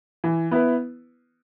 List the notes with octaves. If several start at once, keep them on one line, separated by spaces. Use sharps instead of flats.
E3
B3 E4 B4